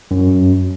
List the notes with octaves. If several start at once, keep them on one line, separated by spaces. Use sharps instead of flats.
F#2